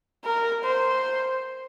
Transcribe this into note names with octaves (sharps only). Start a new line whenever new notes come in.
A#4
C5